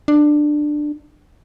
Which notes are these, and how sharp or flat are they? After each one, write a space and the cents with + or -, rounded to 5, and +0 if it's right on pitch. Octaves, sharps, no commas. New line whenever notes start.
D4 +15